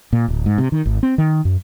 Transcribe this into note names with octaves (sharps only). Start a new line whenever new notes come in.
A#2
D1
G#2
C3
D#3
G#1
C4
D#3
F#2